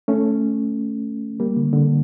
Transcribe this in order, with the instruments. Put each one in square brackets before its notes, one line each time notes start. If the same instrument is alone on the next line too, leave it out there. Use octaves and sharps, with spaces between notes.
[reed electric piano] A3 C#4
G3 A#3
D3
D3